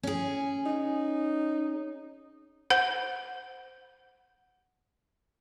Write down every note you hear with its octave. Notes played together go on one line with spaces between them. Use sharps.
C#4 G#4
D#4
C5 F#5